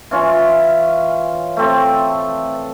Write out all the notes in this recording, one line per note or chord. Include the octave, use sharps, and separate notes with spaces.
E3 C#4 F4
A3 C4 A4